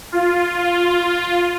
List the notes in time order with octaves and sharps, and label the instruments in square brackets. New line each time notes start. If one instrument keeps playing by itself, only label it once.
[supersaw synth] F4